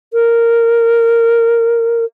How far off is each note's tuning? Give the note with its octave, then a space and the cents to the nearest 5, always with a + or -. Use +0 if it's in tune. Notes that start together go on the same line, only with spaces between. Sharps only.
A#4 -10